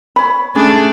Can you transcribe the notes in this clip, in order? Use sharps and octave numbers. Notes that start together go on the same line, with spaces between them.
C#5 B5
A3 C#4 D4 G#4